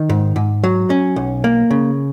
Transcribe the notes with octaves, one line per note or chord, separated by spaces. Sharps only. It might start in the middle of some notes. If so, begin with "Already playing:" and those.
Already playing: D#3
G#2
G#2
F#3
C#4
B1
A#3
C#3